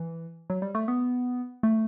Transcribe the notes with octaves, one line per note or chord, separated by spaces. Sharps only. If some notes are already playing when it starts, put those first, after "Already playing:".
Already playing: E3
F#3
G3
A3
B3
A3